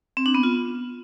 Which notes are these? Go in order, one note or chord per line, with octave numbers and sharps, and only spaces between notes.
C4
D4
B3
F4